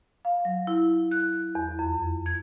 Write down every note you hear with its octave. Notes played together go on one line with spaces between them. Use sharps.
F5
F#3
E4
F#6
E2
F2
G#6